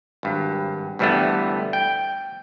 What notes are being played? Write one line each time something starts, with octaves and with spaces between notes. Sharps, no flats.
G#1 G2
D2 G2 E3 G3 A3 B3
G5